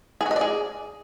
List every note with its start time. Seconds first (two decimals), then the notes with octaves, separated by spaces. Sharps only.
0.21 G#4
0.26 F#4
0.31 D#5
0.36 D5
0.41 G#4